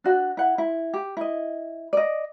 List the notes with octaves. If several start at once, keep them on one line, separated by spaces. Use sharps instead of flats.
D4 F#4 F#5
E4 F#5
E4
G4
E4 D#5
D5 D#5